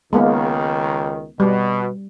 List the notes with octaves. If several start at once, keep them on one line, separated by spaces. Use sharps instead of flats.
C#2 D#3 G#3 A#3 B3
B2 G3